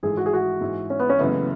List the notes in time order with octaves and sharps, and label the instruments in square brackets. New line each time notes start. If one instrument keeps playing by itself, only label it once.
[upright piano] G#1 G#2 E3 A3 [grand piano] G#4
[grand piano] F#4
G#4
F#4
[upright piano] G#2 E3 G#3
[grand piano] C#4
B3
C#4
[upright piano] F#1 F#2 C#3 E3 A3 [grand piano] B3